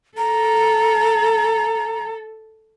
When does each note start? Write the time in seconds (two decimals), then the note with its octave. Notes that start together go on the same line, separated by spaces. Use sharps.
0.18 A4 A#5